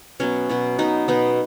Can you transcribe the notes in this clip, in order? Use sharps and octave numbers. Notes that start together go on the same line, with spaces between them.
B2 F#3 B3 C#4
B2 F#3 B3
B2 B3 D#4
B2 B3 D#4